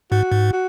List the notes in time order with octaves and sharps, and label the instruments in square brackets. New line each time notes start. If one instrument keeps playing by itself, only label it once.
[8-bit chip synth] G#2 [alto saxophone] F#4
[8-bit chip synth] G#2
[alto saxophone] F#4